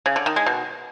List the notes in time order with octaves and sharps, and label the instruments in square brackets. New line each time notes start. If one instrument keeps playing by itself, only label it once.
[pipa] C#3
D3
D#3
G#3
B2